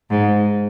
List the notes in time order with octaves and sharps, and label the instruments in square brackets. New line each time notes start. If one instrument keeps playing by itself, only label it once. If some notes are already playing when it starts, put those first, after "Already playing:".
[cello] G#2